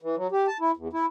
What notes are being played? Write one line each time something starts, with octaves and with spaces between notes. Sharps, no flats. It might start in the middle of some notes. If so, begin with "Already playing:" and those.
E3
F#3
G4
A5
E4
E2
E4